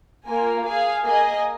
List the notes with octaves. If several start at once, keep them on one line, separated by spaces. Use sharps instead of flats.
A#3 F4 A#4 G#5
G#4 F5 G#5
A#3 G#4 D#5 G#5